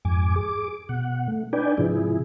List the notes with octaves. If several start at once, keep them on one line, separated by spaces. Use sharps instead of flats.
F2 G#2 G#5 D6
G#4 D6
B2 F#5
A3
D4 D#4 B4 D5 G5 G#5
G#2 C3 F3 E4 G#4